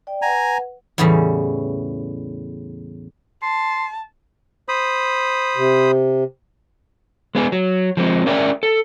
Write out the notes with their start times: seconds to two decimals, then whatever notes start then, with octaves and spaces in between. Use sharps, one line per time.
0.07 D5 G5
0.22 B4 F#5 G#5 A#5
0.98 E2 A2 C#3 E3 G3 C#4
3.43 A5 C6
4.68 C5 B5 D#6
5.56 C3
7.35 G#3 B3 G#4
7.52 F#3
7.97 F3 G#3 C4
8.26 C#4 G#4 A#4 D5 E5 G5
8.63 A4